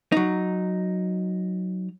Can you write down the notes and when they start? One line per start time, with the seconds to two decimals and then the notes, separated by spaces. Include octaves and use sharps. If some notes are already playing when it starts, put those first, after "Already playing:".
0.12 F#3 D#4